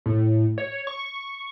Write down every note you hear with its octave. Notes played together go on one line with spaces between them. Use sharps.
A2
C#5
C#6